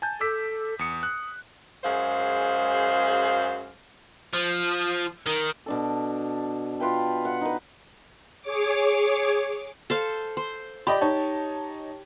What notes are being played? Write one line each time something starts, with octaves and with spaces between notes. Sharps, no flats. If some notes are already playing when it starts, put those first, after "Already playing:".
G#5 A5 G6
A4 D6 E6 B6
E2 D#6 C#7
F#6
F#2 G#3 G#4 C5 F5
F3
D#3
B2 D4 A4
F4 B4 G5
F#5
D#4 B4
G#4 C#5 D6
A4 C5 F5
C5
G4 D5 D#5 B5
D#4 C#5 A5